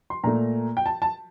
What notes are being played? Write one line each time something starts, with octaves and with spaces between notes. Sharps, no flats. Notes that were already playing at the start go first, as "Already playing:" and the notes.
C6
A#2 A3 A#5
G5
A5
A5